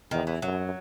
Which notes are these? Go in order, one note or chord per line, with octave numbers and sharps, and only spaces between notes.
E2 D#3
E3
F#2 F#3